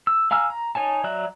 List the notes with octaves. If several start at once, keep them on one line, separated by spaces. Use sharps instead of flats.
E6
F5 G#5 A#5 E6 F6
A#5
D#4 C#5 G#5 A5
F#3 D5 E5 A#5 F#6